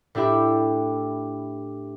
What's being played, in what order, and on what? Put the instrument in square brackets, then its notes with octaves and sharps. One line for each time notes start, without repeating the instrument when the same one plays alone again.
[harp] A2 D4 E4 G4 E5 B5